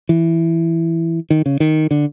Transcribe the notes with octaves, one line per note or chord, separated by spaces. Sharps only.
E3
D#3
C#3
D#3
D3